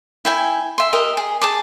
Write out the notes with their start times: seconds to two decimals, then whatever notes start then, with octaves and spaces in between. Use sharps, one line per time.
0.25 E4 G5 G#5
0.78 E5 C6
0.93 G4 A#4 D#5 E5
1.17 G#4
1.41 G#4 A5 D6